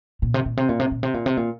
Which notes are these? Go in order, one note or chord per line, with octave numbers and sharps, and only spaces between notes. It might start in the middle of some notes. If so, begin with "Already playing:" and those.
A#2
C3
A#2
C3
A#2
C3
A#2
C3
A#2
C3
A#2